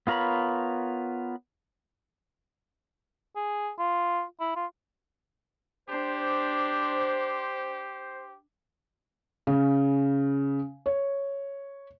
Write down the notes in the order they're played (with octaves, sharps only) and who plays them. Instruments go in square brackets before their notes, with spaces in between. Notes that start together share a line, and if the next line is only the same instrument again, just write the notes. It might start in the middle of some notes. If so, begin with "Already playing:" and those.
[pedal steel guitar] B3 F4 A#4 C#5 B5
[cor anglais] G#4
F4
E4
F4
[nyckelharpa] D4 [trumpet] G4 [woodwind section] C5
[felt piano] C#3
C#5